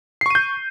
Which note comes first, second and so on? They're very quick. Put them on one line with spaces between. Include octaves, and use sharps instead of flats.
C7 C#6 D#7 G6